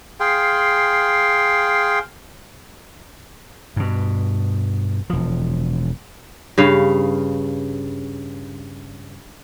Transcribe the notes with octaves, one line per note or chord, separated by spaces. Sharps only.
G#4 F5 G5 C6
G2 B2
E1 F3
G2 C#3 F5